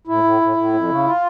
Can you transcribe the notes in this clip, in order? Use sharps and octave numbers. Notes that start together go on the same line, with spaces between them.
A2 E4
A2
A2
A2
F2
C#3
F4